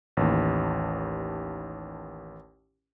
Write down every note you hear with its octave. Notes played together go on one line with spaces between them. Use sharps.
A1 D#2